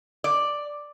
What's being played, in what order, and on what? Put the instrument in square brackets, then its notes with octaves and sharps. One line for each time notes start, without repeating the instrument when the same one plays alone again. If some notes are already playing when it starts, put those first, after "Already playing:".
[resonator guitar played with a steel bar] D5